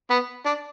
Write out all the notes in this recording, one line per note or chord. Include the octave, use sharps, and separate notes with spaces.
B3
D4